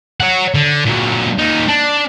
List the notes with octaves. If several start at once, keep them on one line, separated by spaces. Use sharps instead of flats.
C#5 F#5
D3
A#2 F#3
A#2 D#4
D4